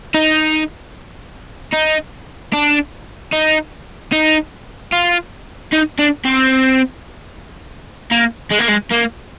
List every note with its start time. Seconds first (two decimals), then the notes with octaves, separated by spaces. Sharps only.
0.14 D#4
1.73 D#4
2.54 D4
3.32 D#4
4.12 D#4
4.92 F4
5.73 D#4
5.99 D4
6.25 C4
8.12 A#3
8.51 G#3
8.60 A#3
8.69 G#3
8.92 A#3